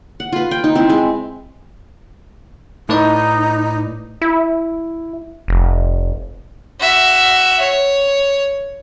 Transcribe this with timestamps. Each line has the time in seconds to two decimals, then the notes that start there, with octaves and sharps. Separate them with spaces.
0.20 F#5
0.32 F4 B4
0.51 G5
0.64 D#4
0.75 C4 E4
0.90 G#3
2.89 A2 D#4 B4 D5
4.21 E4
5.48 F1
6.80 F#4 E5
7.61 C#5